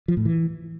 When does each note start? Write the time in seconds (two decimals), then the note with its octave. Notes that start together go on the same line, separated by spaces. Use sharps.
0.08 F3
0.17 A2
0.25 E3